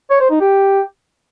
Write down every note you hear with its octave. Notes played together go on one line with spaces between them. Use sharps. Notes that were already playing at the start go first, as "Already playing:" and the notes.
C#5
C5
D#4
G4